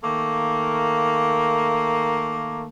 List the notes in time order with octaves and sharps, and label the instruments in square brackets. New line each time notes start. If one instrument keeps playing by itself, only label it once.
[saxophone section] D#3 A3 A#3